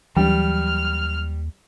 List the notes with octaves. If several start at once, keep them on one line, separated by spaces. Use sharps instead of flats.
D#2 E3 F#3 G3 F6